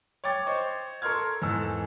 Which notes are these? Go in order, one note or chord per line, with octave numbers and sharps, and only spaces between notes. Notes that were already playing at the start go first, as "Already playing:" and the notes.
C#5 G5 D6 A6
C5 C#5 D#5 C#6
A4 A#4 C6 C#6 F6 G#6
E2 G#2 A4 E6